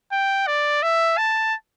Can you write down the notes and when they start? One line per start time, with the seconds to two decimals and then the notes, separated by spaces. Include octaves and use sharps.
0.12 G5
0.47 D5
0.83 E5
1.18 A5